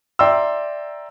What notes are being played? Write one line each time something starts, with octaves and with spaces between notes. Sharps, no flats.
D5 E5 G5 A#5 C6 E6